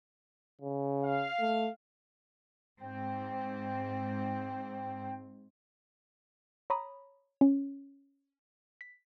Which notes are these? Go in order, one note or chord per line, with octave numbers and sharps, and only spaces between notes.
C#3
F5
A3
G#2 C4 G5
C#5 A#5 B5 D#6
C#4
B6